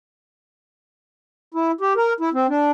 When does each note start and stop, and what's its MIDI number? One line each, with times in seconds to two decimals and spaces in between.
1.54 1.71 64
1.81 1.93 67
1.96 2.13 70
2.20 2.29 64
2.33 2.47 60
2.49 2.71 62